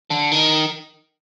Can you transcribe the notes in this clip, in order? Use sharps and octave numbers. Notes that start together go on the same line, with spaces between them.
D3
D#3